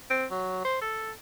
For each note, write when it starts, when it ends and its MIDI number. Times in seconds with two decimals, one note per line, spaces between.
0.10 0.25 60
0.31 0.61 54
0.65 0.78 72
0.81 1.11 69